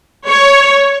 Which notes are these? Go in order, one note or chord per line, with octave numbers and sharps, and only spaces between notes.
C#5